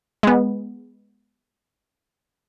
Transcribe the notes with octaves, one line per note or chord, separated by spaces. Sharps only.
G#3 B3